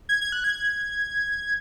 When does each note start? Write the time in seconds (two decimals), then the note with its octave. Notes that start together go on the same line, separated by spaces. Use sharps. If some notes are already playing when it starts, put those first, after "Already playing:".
0.09 G#6
0.21 G#6
0.32 F#6
0.44 G#6